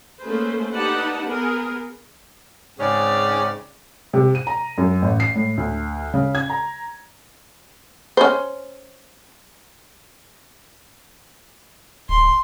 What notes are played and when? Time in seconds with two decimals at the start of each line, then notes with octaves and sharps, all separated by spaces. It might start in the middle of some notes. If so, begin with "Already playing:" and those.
0.21 A3 A#3 C#4 G#4 B4 C5
0.75 D#4 G4 B4 D5 F#5 A5
1.25 B3 G#4 A#4
2.79 G#2 C#3 C4 C#4 G#4 D5
4.13 C3
4.35 D#7
4.47 A#5
4.78 F#2
5.02 A1
5.20 C7
5.35 A2
5.57 D2
6.14 C#3
6.35 G#6
6.50 A#5
8.17 C#4 C5
12.09 D1 C6